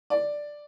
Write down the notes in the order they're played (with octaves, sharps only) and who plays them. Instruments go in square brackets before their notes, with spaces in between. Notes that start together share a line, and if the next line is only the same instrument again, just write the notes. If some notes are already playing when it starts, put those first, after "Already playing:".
[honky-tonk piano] D5